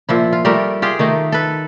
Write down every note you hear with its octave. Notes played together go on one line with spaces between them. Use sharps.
A#2 F3 E4
F4
G3 A3 G4 A#4
F4 G4 G#4
D#3 A3 D#4
A4 B4